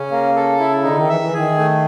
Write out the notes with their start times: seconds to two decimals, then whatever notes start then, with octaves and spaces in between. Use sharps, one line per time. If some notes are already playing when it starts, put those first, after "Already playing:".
Already playing: C#3 C#4
0.11 A#3
0.36 A4
0.59 E4
0.84 D3 D#4
0.96 D#3
1.08 E3 E5
1.21 E3
1.33 D#3 G#4
1.57 A3